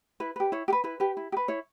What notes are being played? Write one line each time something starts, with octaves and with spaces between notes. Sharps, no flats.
E4 B4
G4 B4
E4 C#5
G4
B4
E4 B4
G4 B4
E4
G4
B4
E4 C#5